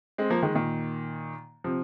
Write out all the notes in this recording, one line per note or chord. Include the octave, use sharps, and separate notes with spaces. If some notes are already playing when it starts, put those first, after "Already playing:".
G#3 C4
F3 A#3
D#3 G#3
A#2 D#3
C3 F3